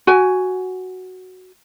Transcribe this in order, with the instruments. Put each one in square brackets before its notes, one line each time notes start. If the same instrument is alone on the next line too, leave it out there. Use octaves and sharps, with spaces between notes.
[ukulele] F#4 G#5